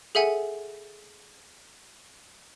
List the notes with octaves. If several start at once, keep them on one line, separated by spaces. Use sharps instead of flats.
G#4 A4 E5 F#5 G#5